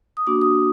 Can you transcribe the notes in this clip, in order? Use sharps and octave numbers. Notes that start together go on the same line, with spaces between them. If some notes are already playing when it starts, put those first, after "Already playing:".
D#6
A#3 D4 F#4 D6
D#6